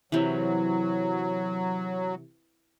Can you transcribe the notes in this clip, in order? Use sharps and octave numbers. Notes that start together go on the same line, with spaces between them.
C3 E3 F#3